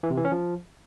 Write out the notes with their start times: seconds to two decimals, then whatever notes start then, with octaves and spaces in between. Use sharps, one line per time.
0.03 E3
0.10 C3
0.18 E3
0.25 C#4
0.32 F3